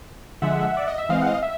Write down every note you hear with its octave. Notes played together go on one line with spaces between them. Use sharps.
D3 F3 G#3 E5 F#5
D5
D#5
E5
E3 G#3 C4 D#5 F5
F#5
D#5 F5
E5